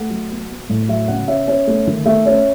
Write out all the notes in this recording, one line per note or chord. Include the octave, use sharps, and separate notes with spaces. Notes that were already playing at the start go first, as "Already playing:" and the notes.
Already playing: A3 F#5
F#3
B3
B3
A2
F#3 E5
C#3 F#5
C#4 E5
C#4
A3
D#3
A3 E5
C#4